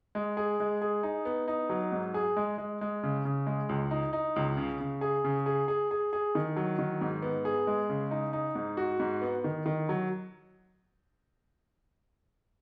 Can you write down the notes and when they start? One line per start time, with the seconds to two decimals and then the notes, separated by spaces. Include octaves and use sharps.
0.15 G#3
0.37 G#4
0.60 G#3
0.82 G#4
1.03 D#4
1.25 B3
1.48 D#4
1.70 F#3
1.92 G#2
2.14 G#4
2.36 G#3
2.58 G#3
2.81 G#3
3.03 C#3
3.25 C#3
3.46 G#3
3.69 C#2
3.91 D#4
4.13 D#4
4.36 C#2
4.57 C#3
4.80 C#3
5.01 G#4
5.24 C#3
5.46 G#4
5.68 G#4
5.91 G#4
6.13 G#4
6.35 D#3
6.56 F#3
6.79 D#3
7.01 G#2
7.22 B3
7.45 G#4
7.67 G#3
7.89 C#3
8.11 D#4
8.33 D#4
8.55 G#2
8.77 F#4
9.00 G#2
9.22 B3
9.44 D#3
9.66 D#3
9.89 F#3